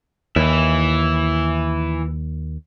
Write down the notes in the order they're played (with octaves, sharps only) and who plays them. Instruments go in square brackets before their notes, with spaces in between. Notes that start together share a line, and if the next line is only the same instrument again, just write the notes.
[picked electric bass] D#2 [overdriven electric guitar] E3 E4